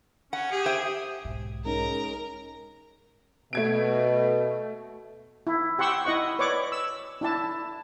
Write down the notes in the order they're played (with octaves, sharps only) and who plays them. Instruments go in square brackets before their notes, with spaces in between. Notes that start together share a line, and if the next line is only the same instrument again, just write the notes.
[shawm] C#4 [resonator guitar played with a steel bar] F#5
[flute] G4 [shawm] G#4
[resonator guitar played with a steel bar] C5 E5 G5
[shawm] D#6
[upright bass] B1 G#2
[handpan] G#3 C#4 D#4 [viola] A#4 [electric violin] A#5
[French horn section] B2 [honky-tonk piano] A3 G#6 D7
[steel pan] E4
G4 F#5 C6 C#6 E6
E4 D#5 F#5 C#6
B4 C#5 D5 C#6 D6
E6
D4 E4 A5